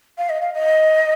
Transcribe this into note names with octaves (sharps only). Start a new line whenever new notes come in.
F5
D#5
F5
D#5